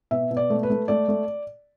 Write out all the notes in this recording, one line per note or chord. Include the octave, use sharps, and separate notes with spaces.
B2 E5
B2
D5
A3
B4
A3
A3 D5
A3